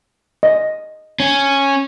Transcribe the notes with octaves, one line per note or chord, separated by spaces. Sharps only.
D#5
C#4